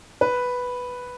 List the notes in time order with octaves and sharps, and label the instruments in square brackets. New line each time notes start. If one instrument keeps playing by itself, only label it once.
[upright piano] B4